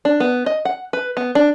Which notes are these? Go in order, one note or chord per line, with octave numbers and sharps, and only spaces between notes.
D4
B3
D#5
F#5
B4
B3
D4